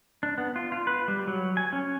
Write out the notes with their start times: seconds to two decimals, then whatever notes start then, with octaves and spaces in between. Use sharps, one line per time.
0.23 D4
0.38 B3
0.56 F4
0.72 F4
0.87 B4
1.08 G3
1.27 F#3
1.57 G#5
1.73 C#4